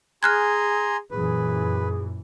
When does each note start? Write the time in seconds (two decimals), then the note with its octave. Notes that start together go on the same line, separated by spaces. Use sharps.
0.23 G#4 G#5 A#5 C6 F6 F#6 G#6
1.11 F#2 A#2 E3 G#4 B4